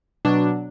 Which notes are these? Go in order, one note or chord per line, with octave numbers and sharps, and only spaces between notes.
B2 F#3 D4